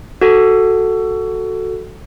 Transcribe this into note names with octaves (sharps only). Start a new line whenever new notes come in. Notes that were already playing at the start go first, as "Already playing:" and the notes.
F#4 A4